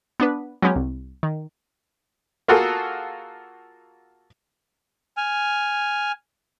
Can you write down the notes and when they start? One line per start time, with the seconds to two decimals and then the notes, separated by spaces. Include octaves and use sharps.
0.20 B3 D4 B4
0.62 F#3 G#3 B3 C#4 G4
0.76 C2
1.23 D#3
2.48 A#3 F4 F#4 G#4 A4
5.17 G#5 F6